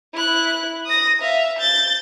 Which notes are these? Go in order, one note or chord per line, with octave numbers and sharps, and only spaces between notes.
E4 F#6
D#6 A#6
E5 F5
G6 A6